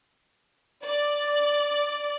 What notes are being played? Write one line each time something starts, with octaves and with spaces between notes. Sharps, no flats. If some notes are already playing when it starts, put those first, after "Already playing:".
D5